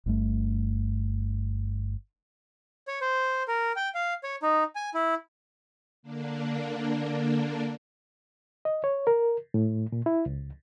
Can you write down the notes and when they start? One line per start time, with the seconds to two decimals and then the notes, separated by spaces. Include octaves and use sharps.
0.06 G1 G2 A3
2.88 C#5
3.01 C5
3.48 A#4
3.76 G5
3.95 F5
4.24 C#5
4.42 D#4
4.75 G#5
4.94 E4
6.02 D3 A#3 D4
8.65 D#5
8.84 C#5
9.07 A#4
9.54 A2
9.92 A#2
10.06 E4
10.26 C#2